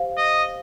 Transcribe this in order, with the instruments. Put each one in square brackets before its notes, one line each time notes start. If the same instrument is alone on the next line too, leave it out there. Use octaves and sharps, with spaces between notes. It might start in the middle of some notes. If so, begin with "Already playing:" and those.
Already playing: [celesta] G4 C5 F5
[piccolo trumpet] D#5